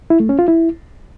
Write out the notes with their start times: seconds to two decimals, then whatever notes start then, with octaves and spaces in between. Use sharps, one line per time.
0.10 E4
0.20 A3
0.29 C#4
0.39 F4
0.48 E4